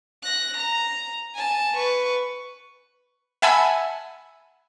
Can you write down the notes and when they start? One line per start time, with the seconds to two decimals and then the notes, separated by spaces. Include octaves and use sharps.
0.23 F#6 A#6
0.58 A#5
1.35 G#5 A5
1.77 B4 C#6
3.42 E5 F#5 G#5 A5 B5 E6